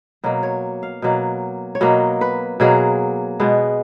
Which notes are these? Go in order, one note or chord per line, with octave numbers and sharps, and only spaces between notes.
B2 F#3 A#3
C#5
F5
B2 F#3 A#3
C#5
B2 F#3 A#3 D#5
B4
B2 F#3 A#3 G#4
B2 G#3 B3